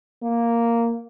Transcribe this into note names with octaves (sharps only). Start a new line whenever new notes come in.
A#3